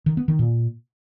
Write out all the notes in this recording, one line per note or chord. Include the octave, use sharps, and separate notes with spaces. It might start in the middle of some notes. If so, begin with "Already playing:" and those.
D#3
B3
D#3
A#2